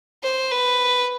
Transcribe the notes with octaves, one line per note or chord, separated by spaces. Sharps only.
C5
B4